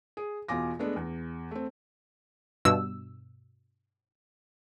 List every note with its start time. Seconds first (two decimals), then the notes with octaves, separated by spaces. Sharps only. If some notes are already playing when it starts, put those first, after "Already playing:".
0.17 G#4
0.48 E2 B2 F4 G#5 D6 A#6
0.79 G#3 A3 B3 D4
0.96 E2
1.51 A3 C4
2.65 G2 B2 E6